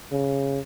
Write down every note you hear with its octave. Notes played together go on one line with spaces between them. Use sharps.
C#3